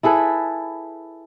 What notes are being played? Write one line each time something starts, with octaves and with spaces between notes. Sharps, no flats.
E4 G#4 A4 B4